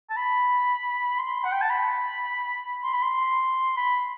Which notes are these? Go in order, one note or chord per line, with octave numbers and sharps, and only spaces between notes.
A5
B5
C6
F#5
G5
A5
B5
C6
B5
C6
B5